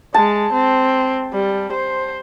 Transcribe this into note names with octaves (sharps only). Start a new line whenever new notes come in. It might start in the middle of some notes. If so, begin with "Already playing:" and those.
G#3 A5
C4
G3
C5